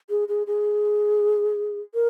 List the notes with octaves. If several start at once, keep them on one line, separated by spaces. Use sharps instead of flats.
G#4
G#4
G#4
A#4